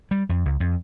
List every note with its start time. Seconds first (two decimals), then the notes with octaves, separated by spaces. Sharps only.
0.11 G3
0.29 F2
0.45 C#2
0.60 F2